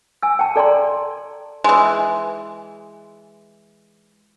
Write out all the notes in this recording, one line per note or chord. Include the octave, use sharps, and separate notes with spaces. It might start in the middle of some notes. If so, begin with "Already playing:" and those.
G#5 E6
G5 A5
A4 D5 A#5 C6
E3 G#3